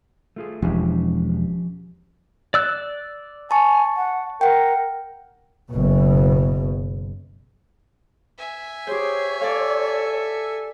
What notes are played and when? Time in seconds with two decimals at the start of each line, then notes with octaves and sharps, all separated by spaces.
0.36 A3 F4 G#4
0.62 E1 F3 C#4 G4
2.54 D5 E6 F#6
3.51 G#5 A5 C#6
3.97 F#5
4.41 A#4 F#5 G5
5.70 F#1 B2
8.38 E5 G#5
8.87 G4 G#4 C5 C#5
9.41 A4 D5 F5